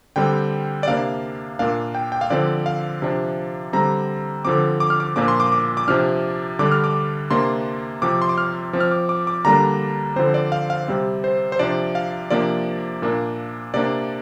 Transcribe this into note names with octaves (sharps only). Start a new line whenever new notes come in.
D3 G3 C4 G5
D5
C3 A#3 D4 F5
A#2 A#3 D4 F5
G5
G5
F5
D3 F3 C4 D5
F5
C3 F3 D4
D3 G3 C4 A#5
D3 F3 C4 D6
D6
F6
D6
A#2 F3 A#3 D4 D6
C6
D6
D6
D6
C3 F3 D4 F6
D3 G3 D4 D6
F6
D6
C3 A#3 D4 C6
C3 F3 C4 D6
C6
D6
F6
F3 C4
F6
D6
D6
D6
D3 G3 A#3 D4 A#5
D3 F3 C4 C5
D5
F5
F5
C3 G3 C4
C5
C5
C3 F3 D4 D5
F5
C3 F3 A#3 D4 D5
A#2 A#3 D4
C3 A#3 D4 D5